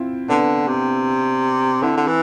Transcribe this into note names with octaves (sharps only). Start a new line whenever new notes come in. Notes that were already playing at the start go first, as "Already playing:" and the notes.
Already playing: C4 E4 F4
D3 B3 D4
C3
D3 C4 E4
D3
E3